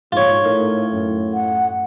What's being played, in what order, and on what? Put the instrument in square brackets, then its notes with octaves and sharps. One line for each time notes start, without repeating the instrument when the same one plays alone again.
[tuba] A#1 [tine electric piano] G#2 [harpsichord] F4 C#5
[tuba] A2 [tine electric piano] D#4 A4 A#4
[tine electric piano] F#2
[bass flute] F#5